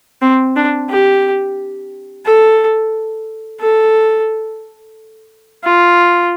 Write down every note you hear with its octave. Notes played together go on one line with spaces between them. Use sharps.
C4
D4
G4
A4
A4
F4